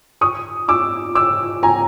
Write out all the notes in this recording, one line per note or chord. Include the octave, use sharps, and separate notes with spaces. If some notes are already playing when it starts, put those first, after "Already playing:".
C#6 D#6
D6 E6
D6 E6
G#5 A#5